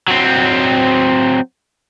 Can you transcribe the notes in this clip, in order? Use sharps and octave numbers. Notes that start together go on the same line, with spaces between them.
F#3 C4